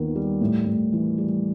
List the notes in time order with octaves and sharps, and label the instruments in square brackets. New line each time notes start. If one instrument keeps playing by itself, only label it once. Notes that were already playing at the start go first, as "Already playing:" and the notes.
Already playing: [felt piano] D#2 D#3 B3
G3
A2
A2
E3
G3